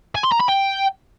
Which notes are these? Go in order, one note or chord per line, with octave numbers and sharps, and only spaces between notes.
G#5
C6
A#5
B5
G5